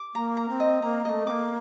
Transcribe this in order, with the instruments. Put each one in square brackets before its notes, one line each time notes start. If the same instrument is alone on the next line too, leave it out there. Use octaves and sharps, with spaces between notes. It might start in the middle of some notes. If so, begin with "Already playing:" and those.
Already playing: [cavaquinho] D6
[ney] A#3 [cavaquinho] A#5
[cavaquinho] A#5
[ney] C4
[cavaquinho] D#5
[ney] A#3 [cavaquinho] A#5
[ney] A3 A#3 [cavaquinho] D#5
[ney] A#3 C4 [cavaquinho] D6